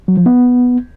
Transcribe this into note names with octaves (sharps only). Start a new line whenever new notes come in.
F#3
F3
B3